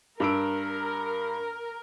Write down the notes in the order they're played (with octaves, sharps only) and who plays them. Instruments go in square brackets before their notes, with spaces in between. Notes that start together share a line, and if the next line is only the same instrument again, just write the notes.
[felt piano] G2 E6 D7 [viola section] A#4